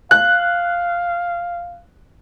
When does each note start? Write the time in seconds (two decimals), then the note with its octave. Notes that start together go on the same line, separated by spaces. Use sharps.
0.11 F5 F#6